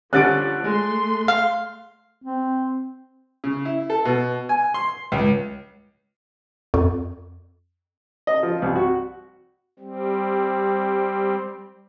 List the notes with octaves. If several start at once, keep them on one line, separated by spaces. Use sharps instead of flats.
D3 F3 G3 C#4 F#6 A6 D7
G#3 A3 C6
F5
C4
C#3
E4
A4
B2
G#5
C6
C#2
F2
D#5
F3
C2
F#4
G3 C4